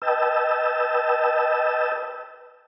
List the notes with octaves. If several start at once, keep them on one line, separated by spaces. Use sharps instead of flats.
B4 D#5 G5 A5 E6